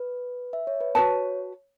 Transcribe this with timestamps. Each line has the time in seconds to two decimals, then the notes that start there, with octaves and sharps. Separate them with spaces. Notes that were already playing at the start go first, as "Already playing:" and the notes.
Already playing: B4
0.53 E5
0.67 C#5
0.81 B4
0.95 F#4 B4 C#5 A5